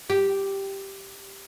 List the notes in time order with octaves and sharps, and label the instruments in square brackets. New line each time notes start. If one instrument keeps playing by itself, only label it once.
[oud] G4